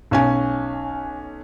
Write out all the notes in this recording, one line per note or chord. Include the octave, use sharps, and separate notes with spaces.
B1 C#4 G#5